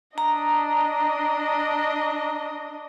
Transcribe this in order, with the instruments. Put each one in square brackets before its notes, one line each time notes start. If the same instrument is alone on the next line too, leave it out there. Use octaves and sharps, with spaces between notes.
[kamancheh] D4 D#5 [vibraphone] A#5